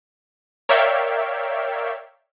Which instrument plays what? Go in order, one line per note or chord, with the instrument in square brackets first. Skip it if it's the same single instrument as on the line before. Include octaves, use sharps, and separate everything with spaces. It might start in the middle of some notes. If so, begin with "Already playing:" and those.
[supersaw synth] A#4 C#5 D5 E5 F5 G5